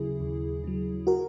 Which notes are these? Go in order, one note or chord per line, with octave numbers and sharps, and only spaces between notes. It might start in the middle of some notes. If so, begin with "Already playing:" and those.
Already playing: D#2 C#3 F#3 E4 G#4
D#2
C#3 F#3
F#4 A#4